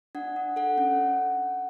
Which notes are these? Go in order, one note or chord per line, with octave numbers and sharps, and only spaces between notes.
D4 F#5
D4
A4 F#5
C#4